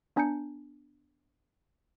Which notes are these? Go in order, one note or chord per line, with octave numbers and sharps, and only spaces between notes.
B3 D4 G#5 A#5 G6 C#7